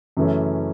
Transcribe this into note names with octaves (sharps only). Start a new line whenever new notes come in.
F#2 C#3 E3 A3 C#4